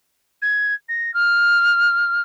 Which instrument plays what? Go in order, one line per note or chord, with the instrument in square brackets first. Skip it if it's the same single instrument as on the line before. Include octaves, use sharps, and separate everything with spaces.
[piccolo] G#6
A#6
F6